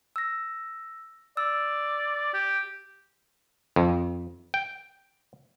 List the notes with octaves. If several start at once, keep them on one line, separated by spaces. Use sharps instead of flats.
E6 A#6
D5 E6
G4
F2
G5